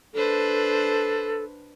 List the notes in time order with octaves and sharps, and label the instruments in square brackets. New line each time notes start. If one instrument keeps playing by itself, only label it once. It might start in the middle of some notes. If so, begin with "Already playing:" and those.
[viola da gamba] D4 B4 C5 [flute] A4